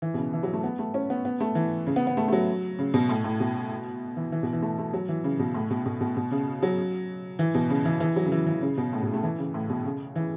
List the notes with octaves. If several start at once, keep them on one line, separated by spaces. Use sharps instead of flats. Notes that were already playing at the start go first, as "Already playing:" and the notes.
E3
B2
C#3
E3
F#3
A3
B3
A3
C#4
B3
B3
A3
E3
C#3
B3
B3
A3
A3
F#3
C#3
B2
A2
A2
B2
E3
E3
B2
E3
A3
A3
F#3
E3
C#3
B2
A2
B2
B2
B2
B2
C#3
F#3
E3
B2
C#3
E3
E3
F#3
C#3
E3
E3
C#3
B2
A2
B2
A3
E3
C#3
A2
B2
C#3
E3